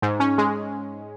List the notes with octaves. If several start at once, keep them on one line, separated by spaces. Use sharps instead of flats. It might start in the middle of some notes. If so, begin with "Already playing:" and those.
G#2
C#4
G#3